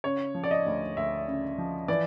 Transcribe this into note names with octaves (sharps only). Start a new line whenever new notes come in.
C#3 C#5
F3
D5
D#5
D2
D2 E5
C#3
F3
E3 D5